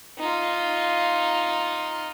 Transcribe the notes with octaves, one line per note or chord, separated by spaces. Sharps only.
D#4 F4